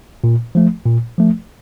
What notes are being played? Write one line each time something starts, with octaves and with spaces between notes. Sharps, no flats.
A#2
F3 A3
A#2
F3 A3